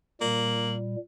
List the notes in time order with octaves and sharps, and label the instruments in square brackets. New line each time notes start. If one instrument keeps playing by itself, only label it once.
[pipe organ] A#2 G3 [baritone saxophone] A#3 [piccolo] F#7